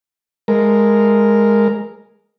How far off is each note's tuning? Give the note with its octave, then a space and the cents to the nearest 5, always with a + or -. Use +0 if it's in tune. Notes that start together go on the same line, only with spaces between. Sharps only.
G#3 -5 A#4 +0